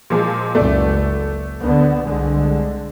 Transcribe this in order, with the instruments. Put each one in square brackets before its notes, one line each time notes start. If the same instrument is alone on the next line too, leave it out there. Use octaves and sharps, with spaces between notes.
[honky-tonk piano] A#2 F3 G#3
[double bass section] F#1 C#2 F#2 [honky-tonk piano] A3 D5
[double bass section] D2 D3 B3
C2 D3 G#3